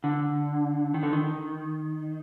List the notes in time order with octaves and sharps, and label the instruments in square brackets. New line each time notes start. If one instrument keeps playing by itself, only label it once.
[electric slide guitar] D3
D#3
D3
D#3